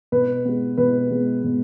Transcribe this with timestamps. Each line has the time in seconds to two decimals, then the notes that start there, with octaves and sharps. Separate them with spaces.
0.12 B2 B4
0.45 G#3 B3
0.78 B2 B4
1.11 G#3 B3
1.44 B2